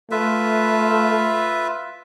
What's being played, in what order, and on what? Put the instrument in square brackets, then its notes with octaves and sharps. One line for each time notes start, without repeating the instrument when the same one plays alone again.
[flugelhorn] A3 [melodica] F4 B4 E5